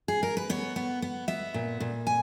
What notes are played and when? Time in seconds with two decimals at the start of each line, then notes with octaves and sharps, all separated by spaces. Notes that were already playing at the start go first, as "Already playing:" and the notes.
0.08 G#4
0.23 A#4
0.37 B4
0.49 B3 C#5
0.76 B3
1.02 B3
1.28 B3 E5
1.54 A#2
1.80 A#2
2.07 G#5